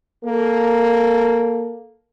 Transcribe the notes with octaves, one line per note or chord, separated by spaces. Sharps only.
A#3 A4